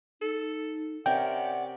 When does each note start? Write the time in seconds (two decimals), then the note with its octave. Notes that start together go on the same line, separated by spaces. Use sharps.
0.22 D#4 A4
1.06 C3 C#4 A#4 D5 F#5 G5